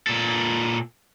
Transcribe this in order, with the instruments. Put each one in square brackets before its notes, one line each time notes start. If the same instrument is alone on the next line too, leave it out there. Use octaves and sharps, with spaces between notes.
[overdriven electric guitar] A#2 A4